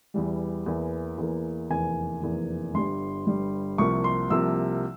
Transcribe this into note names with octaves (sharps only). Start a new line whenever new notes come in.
E2 E3 G3
E2 E3 A#3
E2 E3 A#3
F1 E2 E3 A#3 G#5
F1 E2 E3 A#3
G1 G2 G3 C6
G1 G2 G3
C2 C3 F3 A#3 C#6
C6
C2 C3 F3 A#3 E6